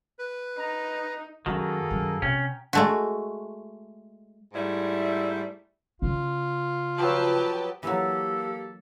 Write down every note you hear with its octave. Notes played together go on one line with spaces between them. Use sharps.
B4
D#4 A#5
F#2 D#3 A#3 F#4 G#4 A4 A#5 D#6
F#2
C3 C#4 G5
G#3 A3 F#4
G#2 G3 A3 E4
C#3 F4
F3 F#3 G4 B4 A5
E3 F#3 A#3 G4 A4